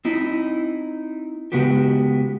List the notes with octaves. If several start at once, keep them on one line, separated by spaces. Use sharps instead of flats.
C4 D#4 E4
C#3 G#3 B3 F#4 G4